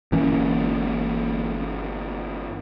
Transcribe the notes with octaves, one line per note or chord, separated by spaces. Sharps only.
G1 E3 A#3 C#4